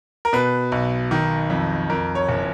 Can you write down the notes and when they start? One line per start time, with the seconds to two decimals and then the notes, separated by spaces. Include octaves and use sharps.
0.25 A#4
0.33 B2 B4
0.72 B1
1.11 D#3
1.50 F2
1.90 F2 A#4
2.15 C#5
2.29 F#1